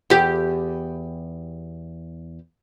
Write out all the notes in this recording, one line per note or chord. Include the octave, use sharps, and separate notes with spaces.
E2 G4